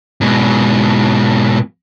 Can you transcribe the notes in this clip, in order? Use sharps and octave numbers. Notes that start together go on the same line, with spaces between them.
G#2 B2